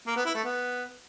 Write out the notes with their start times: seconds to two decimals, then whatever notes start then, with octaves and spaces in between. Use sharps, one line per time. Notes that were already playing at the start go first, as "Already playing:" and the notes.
0.07 A#3
0.16 B3
0.26 E4
0.35 A3
0.44 B3